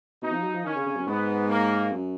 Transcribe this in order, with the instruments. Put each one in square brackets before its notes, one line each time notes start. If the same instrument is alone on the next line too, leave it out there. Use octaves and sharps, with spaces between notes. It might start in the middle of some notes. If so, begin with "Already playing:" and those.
[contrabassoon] B2 [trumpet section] D#4
[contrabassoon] F3
F#3
F3
[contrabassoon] D#3 [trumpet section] C#4
[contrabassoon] C#3
C#3
F#2
[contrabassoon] G#2 [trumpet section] B3
[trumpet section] A#3
[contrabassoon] F#2